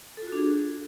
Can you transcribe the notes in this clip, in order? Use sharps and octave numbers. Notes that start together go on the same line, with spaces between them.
A4
F4
F#4
D4
G#4